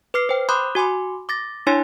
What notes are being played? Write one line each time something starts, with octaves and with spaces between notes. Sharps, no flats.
B4 D6 F6 C7
C5 G5
B5 C6 D6 D#6 F#6 G6
F#4 G#5 C6 D6
D6 A6 A#6
D4 E4 C#5 G#5 C6 A6